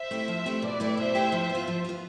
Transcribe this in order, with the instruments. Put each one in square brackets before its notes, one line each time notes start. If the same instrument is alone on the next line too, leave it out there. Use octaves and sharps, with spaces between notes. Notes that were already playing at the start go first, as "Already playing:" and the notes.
Already playing: [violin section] C5 E5
[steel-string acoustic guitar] A3 C4 E4 G4
F3
A3 C4 E4 G4
[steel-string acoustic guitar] B2 [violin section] B4 D5
[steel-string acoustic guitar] A3 E4 G4
[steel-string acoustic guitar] B2 [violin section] C5 E5
[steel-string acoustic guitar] A3 E4 G4
F3
B3
F4
F3
B3 F4